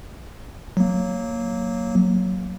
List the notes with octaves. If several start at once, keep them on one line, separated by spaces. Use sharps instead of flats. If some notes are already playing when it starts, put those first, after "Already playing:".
F#3 A#3